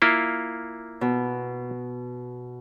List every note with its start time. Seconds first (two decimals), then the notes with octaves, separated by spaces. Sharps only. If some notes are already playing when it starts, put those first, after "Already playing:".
0.02 A#3 E4 F4
1.01 B2